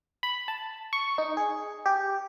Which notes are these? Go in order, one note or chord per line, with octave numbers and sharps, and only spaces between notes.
B5
A5
C#6
D#4
G#4
G4